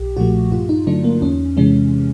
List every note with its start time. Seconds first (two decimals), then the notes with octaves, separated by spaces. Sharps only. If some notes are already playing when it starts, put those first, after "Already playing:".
Already playing: B1 G4
0.17 A#2 F3 A3 F#4
0.52 G2 F4
0.69 D#4
0.87 D3 F#3 A3 D4
1.04 A#3
1.22 E2 C#4
1.57 C3 E3 G#3 C#4